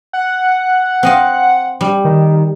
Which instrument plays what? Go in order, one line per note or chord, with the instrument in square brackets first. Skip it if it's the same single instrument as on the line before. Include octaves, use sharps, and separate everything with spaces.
[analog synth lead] F#5
[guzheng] C4 D#5 F5
G3
[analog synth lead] D#3